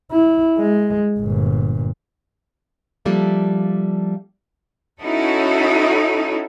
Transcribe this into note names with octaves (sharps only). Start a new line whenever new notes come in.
E4
G#3
G1 A#2
F3 G3 A#3 D4 A4 E5
C#4 D#4 E4 F#4 A4